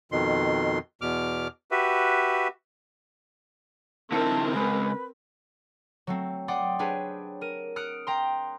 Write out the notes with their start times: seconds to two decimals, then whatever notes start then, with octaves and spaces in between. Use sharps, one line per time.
0.12 F2 B2 D#3 C6
1.01 E2 B2 D6 F6
1.71 F#4 G4 B4 E5
4.12 D3 C4 D#4 E4 A#4 A5
4.53 C#3 G#3 C#4 B4
6.07 F#3 A3 C4
6.48 D5 F#5 G5 C6 D6 D#6
6.79 C4 D4 G4 G#4 B4 C#5
7.41 A#4 D#7
7.76 D#6 F6 F#6 C#7 D7
8.07 G5 A#5 C6